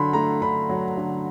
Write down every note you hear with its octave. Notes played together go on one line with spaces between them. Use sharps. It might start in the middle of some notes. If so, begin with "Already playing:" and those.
Already playing: D3 F#3 B5 C6
A3 A#5
D3 B5
F#3
D3